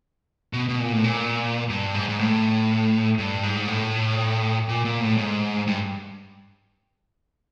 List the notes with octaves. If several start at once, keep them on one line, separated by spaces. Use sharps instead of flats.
B2
B2
A#2
A2
A#2
G2
G#2
G#2
A2
G2
G#2
A2
A#2
A#2
A2
G#2
G2